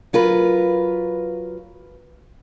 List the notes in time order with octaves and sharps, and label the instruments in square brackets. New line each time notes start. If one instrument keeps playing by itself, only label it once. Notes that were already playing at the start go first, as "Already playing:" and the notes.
[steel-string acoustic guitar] F#3 F4 A#4 B4